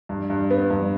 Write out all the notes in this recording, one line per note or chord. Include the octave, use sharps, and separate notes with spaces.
G2
G2
B3
G2